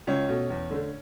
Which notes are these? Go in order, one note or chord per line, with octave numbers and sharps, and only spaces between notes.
C#2 C#4 C#5
B2 A3
E2
D3 A3